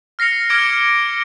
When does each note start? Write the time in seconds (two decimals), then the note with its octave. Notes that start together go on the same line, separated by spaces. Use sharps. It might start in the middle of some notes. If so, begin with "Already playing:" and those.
0.19 F6 A#6 C7 C#7 F7
0.50 D6 F6 G#6 C7 D7 G7